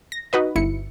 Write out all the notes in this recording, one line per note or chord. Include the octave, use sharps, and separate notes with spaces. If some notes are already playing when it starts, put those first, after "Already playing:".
A#6
D#4 F#4 B4 D#5
G1 E4 C#7